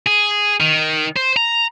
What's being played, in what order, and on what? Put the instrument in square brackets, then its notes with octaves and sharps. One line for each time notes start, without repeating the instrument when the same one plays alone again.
[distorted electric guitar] G#4
D#3
C5
A#5